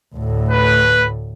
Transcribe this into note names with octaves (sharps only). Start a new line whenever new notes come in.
D2 A2
B4